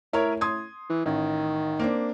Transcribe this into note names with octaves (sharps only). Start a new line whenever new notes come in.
A2 E4 A#4 C#5
C6 D#6 G#6
E3
A1 D#3
A#3 C4 D4